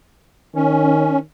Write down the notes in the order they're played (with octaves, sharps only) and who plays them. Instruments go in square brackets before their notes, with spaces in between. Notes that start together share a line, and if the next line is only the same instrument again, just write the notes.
[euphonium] D#3 [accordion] C#4